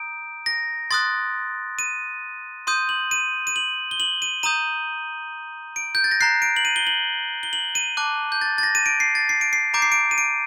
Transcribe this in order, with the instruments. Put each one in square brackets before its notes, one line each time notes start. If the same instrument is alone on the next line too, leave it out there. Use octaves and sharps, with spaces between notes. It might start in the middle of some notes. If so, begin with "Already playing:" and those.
Already playing: [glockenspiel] A#5 D#6 G6 D7
A#6
C6 D#6 F#6 A6
D#7
C6 D#6 G6 D#7
F#7
D#7
D#7
F#7
G7
F#7
D#7
A#5 D#6 G6 D#7
D7
G6
A6
A#6
A#5 F#6 C7
D7
F#7
D#7
G7
F#7
G7
F#7
D#7
A5 D6 F#6
G6
A6
A6
A#6
D#7
D7
C7
A6
C7
D7
C7
A#5 D6 G6 D7
C7
D7
D#7
D7